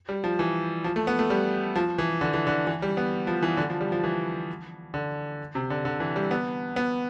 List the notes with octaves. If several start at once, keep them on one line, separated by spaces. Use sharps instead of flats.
G3
F3
E3
F3
A3
B3
A3
G3
F3
E3
D3
E3
D3
E3
G3
B3
F3
E3
D3
F3
G3
F3
E3
D3
C3
D3
D3
E3
G3
B3
B3